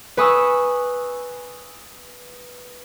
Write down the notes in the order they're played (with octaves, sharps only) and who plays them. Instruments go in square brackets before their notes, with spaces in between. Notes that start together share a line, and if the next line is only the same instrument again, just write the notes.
[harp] B4 G#5 B5 C#6 D#6 E6